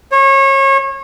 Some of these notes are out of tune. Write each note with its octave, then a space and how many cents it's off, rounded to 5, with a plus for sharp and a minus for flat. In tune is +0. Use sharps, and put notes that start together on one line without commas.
C#5 -30